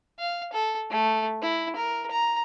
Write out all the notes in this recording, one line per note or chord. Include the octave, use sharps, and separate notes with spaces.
F5
A4
A3
E4
A#4
A#5